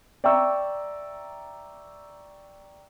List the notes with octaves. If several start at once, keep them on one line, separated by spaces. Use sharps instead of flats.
D5 E5 G5 A#5 C#6 E6